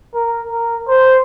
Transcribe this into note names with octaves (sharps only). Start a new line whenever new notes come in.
A#4
A#4
C5